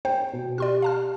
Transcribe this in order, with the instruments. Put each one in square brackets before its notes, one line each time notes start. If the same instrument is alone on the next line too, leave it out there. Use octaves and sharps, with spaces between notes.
[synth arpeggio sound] C5 [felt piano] G5
[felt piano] B2
[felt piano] G4 [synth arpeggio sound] D5 C6 F6
[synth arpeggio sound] F5 A5 F6